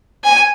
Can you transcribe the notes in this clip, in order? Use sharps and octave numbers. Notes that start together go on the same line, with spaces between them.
G#5